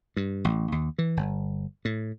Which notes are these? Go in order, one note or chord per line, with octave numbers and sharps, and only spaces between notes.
G2
A1
D#2
E3
G1
A2